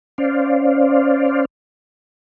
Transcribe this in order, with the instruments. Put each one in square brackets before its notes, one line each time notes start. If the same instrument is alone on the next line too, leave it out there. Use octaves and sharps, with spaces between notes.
[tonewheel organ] C#4 C5 D5 F5